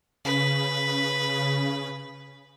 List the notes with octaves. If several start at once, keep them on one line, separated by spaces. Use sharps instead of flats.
C#3 B4